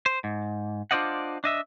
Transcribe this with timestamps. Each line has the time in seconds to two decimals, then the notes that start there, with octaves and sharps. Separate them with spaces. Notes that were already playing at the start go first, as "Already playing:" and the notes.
0.06 C5
0.24 G#2
0.91 D4 F4 C5 D5 D#5 F#5
1.44 D4 D#5 E5